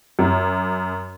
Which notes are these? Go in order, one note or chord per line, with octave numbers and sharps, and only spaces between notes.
F#2